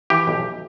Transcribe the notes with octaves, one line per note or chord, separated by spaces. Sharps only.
E3 G4
B1